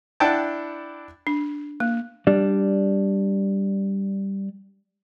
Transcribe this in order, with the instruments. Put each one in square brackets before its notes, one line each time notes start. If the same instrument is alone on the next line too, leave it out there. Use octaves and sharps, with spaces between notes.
[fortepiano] D4 E4 F#5 G5 A5
[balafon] D4
A#3
[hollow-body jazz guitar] G3 D4